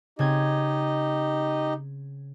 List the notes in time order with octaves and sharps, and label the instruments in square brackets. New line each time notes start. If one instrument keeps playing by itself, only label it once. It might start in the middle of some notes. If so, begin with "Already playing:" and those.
[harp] C#3 C4 G#6 [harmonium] D#4 G4 D#5